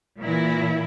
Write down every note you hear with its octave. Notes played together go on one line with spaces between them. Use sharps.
A#2 E3 E4